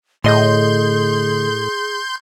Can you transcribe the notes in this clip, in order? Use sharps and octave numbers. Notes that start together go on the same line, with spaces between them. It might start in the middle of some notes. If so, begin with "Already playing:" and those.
D2 A2 G#4 D#5 C6 G6